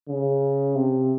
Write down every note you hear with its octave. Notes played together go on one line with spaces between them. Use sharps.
C#3
C3